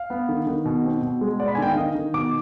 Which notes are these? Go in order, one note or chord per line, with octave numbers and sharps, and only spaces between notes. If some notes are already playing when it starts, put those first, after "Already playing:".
Already playing: F5
B3
D#3
D#3
B2
C4
B2
G#3
B3 D5
B5
G#5
D#3 G5
F5
D#3 D#5
D#3
B2 D6